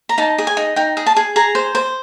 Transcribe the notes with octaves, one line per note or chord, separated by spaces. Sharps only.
A#5
D#4 A5
G#4
G#5
D#4
D#4 G5
G#4
A5
G#4
G#4 A#5
C5
C5